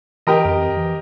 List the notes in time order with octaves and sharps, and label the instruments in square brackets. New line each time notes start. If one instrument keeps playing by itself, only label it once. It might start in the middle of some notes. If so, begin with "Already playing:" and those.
[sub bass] E3 [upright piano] G4 A#4 D#5
[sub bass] F2
E3